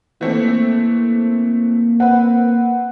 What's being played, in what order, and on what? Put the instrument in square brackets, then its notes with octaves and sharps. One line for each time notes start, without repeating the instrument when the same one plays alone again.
[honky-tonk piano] E3 A3 C4 [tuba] A#3
[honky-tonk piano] C4 B4 [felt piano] F#5